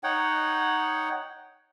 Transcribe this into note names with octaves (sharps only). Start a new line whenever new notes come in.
D#4 C#5 F#5 G5